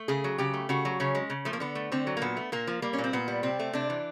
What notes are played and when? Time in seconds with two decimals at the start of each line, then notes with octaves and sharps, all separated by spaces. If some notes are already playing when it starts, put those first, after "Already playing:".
Already playing: A3
0.08 C#3 G#4
0.24 F#3
0.38 C#3 G4
0.54 A3
0.69 C#3 F#4
0.85 F#3
1.00 C#3 C#4
1.15 G#3
1.30 C#3
1.45 F3 A3
1.53 A#3
1.60 D3 B3
1.75 A3
1.92 D3 C4
2.07 F#3
2.17 A#3
2.22 A#2 B3
2.37 A3
2.52 A#2 A#3
2.67 F3
2.82 G3 A#3
2.93 C#4
2.98 A#2
3.04 C4
3.13 A#2 B3
3.28 G3
3.43 C3 C4
3.59 A3
3.73 C3 D4
3.90 E3